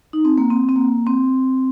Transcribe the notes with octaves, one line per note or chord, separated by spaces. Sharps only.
D#4
C4
A#3
C4
C4
A#3
C4